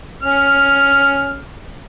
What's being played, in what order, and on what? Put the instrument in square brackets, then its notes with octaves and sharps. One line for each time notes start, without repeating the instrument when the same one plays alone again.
[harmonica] C#4 F6